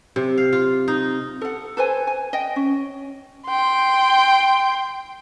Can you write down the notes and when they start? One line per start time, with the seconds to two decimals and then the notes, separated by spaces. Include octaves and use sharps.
0.16 C3
0.38 F5
0.53 F4
0.88 D#4
1.41 A4 F#5
1.77 A4 B4 C5 G#5
2.07 G#5
2.33 D#5 G5
2.56 C#4
3.47 G5 C6